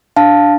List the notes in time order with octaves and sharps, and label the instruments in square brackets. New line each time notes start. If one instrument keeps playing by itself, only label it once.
[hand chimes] D4 F5 A5